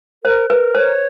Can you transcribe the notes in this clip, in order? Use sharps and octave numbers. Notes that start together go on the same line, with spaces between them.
A#4 C5
A#4 B4
C5 C#5